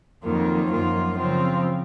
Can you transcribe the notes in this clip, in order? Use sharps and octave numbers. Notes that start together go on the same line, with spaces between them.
F2 D#3 F#3 A#3 F4
F#2 F3 A#3 F4
C#3 F3 C4 F4